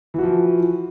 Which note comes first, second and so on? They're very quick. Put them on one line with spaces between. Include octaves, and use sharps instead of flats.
E3 F#4 F3